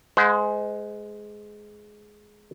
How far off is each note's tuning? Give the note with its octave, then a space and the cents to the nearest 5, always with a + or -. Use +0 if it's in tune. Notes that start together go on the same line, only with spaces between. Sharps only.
G#3 +10 C5 -35 F#5 -40